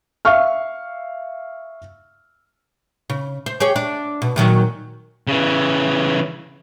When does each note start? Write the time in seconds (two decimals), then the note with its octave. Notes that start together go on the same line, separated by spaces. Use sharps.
0.25 E5 F5 C#6 F6
3.10 C#3
3.46 C5
3.60 G4 G#4 C#5
3.76 D4
4.22 B2
4.36 A#2 D#3 F#3
5.27 C#3 E3